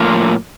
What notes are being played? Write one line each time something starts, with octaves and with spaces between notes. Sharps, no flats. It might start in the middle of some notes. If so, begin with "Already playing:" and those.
Already playing: A2 F3 A#3